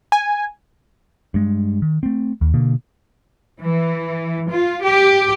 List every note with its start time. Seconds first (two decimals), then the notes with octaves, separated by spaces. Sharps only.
0.12 G#5
1.34 G2 G#3
1.82 D#3
2.03 A3 C4
2.41 D#2
2.54 B2 D3 A#3
3.60 E3
4.49 F4
4.83 G4